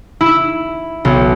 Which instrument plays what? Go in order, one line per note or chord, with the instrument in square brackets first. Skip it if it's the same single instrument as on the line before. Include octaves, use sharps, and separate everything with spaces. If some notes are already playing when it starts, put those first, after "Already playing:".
[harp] E4
B1